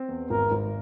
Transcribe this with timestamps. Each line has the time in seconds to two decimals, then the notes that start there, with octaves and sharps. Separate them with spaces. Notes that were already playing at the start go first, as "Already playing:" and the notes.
Already playing: C4
0.09 E2
0.30 G#1 A#4
0.52 G#1